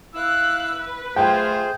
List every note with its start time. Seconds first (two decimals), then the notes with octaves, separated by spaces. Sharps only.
0.15 E4 F5 E6 F#6
0.74 B4
1.16 A3 F4 G#4 C5 G5